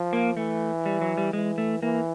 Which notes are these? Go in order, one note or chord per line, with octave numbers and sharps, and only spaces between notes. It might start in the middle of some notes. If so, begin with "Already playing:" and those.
Already playing: F3
A#3
E3 A3
G3
F#3
G3
E3 G#3
A3
E3 A#3